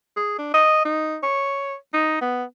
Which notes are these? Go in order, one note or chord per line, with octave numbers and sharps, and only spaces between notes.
G#4
D4
D#5
D#4
C#5
D#4
B3